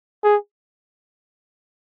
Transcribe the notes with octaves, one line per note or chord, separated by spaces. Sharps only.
G#4